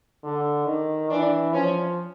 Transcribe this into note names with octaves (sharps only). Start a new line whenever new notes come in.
D3
D#3
E3 D4
F3 C#4